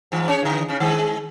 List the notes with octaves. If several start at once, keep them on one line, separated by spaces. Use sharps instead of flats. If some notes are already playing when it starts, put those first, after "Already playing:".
G#2 E3
C#4 C#5
D3 E3
C#3 C#4
D#3 G#3